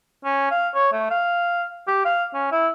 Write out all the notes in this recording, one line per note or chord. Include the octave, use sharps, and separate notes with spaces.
C#4
F5
C#5
A3
F5
G4
F5
C#4
E4